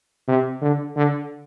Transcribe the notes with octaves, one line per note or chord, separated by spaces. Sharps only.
C3
D3
D3